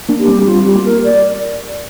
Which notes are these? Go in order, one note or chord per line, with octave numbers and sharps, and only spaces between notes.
A#3 D4
G4
G3 C4
G3 F4
G3 G4
A#3
A#4
D5